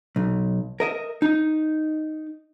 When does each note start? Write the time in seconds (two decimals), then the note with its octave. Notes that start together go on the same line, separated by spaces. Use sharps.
0.16 B1
0.80 A#4 D#5 E5
1.22 D#4